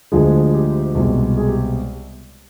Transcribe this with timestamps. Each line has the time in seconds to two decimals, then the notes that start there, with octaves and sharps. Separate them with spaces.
0.12 D2 D3 F3 G#3 G#4
0.54 G4
0.95 C2 B2 G#3
1.37 G#4
1.49 G4